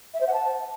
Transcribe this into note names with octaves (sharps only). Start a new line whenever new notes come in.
E5
C5
F#5
A5